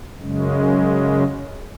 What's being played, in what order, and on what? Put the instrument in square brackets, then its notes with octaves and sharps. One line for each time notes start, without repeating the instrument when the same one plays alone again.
[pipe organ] F#2 C#3 G#3